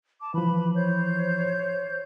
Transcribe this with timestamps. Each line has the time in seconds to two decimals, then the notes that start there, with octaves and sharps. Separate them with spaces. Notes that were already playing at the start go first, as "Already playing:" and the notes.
0.21 A5 D6
0.34 E3 F3 B4 B5
0.74 C5 C#5 G6